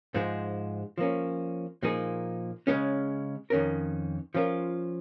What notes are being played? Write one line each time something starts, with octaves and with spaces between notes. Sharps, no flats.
G#2 F3 G#3
F3 A#3 C#4
A#2 F3 A#3 D#4 G#4
C#3 G#3 C#4
F2 D#3 C#4 A#4
F3 C#4 F4 A#4